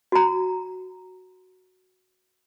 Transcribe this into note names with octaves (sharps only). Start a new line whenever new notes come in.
F#4 A#5